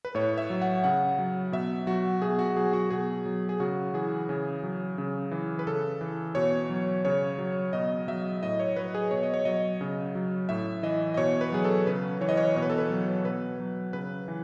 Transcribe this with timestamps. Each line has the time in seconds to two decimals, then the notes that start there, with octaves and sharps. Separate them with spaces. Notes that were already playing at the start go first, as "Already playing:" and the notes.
0.05 B4
0.15 A2 C#5
0.38 E5
0.50 F#3
0.62 F#5
0.84 C#3 F#5
1.19 F#3
1.52 B2 E5
1.87 F#3 F#4
2.22 B2 G#4
2.39 F#4
2.57 F#3 G#4
2.73 F#4
2.90 B2 G#4
3.25 F#3
3.49 G#4
3.60 C#3 F#4
3.94 E3 G#4
4.29 C#3
4.63 F#3
4.98 C#3
5.31 E3
5.59 B4
5.67 C#3 A4
6.01 E3
6.35 B2 C#5
6.70 F#3
7.05 C#3 C#5
7.38 F#3
7.73 B2 D#5
8.08 F#3 E5
8.43 A2 D#5
8.60 C#5
8.76 F#3 B4
8.95 G#4
9.11 B2 C#5
9.23 D#5
9.34 C#5
9.45 F#3 D#5
9.81 C#3
10.15 F#3
10.49 A2 E5
10.83 E3 D#5
11.14 D#5
11.17 B2 C#5
11.41 B4
11.52 F#3 G#4
11.64 A4
11.87 C#3 B4
12.21 E3 C#5
12.29 D#5
12.37 C#5
12.56 B2 C#5
12.62 B4
12.70 A4
12.78 B4
12.90 F#3
13.24 B2 B4
13.60 F#3
13.93 C#3 B4
14.28 E3